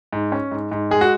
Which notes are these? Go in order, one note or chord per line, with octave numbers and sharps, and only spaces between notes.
G#2
C#4
G#2
G#2
G#3 G#4
F#4